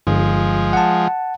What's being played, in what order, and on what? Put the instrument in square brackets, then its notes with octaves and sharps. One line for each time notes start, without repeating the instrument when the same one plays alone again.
[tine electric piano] G1 [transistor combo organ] F3 G#3
[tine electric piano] F#5 A5